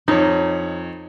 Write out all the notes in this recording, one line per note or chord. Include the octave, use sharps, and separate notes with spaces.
F2 D#4 C#5